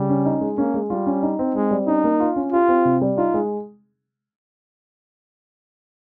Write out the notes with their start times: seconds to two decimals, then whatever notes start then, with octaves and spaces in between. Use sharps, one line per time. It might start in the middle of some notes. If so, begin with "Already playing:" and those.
Already playing: C#3 G3
0.09 C#4
0.26 D#4
0.41 G#3
0.58 A#3 C#4
0.74 G#3
0.90 G3 F4
1.06 C#4
1.23 D#4
1.39 C4
1.55 G#3 C4
1.71 G3
1.87 C#4 D#4
2.04 A#3
2.20 F4
2.36 C#4
2.52 F4 G4
2.69 C4
2.85 C3
3.01 G3
3.17 D#4 F4
3.34 G#3